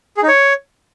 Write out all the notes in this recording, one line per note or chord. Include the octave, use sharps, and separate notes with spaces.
G#4
D#4
C#5